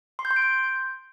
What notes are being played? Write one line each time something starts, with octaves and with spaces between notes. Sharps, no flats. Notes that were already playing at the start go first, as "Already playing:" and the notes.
C6
G6
C6
D7
G6